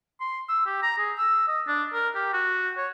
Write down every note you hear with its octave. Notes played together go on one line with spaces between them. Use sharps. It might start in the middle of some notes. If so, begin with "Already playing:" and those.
C6
E6
G4
A#5
G#4
E6
D#5
D4
A#4
G4
F#4
C#5